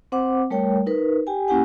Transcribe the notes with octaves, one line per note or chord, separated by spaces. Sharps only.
C4 C5 F#5 D6
G3 A3 A#4 C#5 G5
D#4 A#4 B4
G4 G5 G#5
A#3 C#4 E4 G4 F#5 G#5